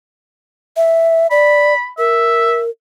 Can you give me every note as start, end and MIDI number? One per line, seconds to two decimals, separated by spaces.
0.77 1.27 76
1.31 1.73 74
1.31 1.89 83
1.98 2.69 70
1.98 2.61 76